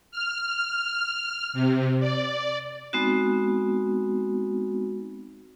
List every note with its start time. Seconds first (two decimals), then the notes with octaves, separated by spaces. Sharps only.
0.11 F6
1.53 C3
2.00 D5
2.93 G#3 B3 C4 D#4 F#4